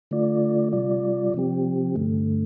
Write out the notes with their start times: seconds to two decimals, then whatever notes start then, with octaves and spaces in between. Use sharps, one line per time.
0.11 D3 A3 F4 D5
0.73 C3 G3 F4 D5
1.34 C3 F3 C4 G4
1.96 G2 D3 A3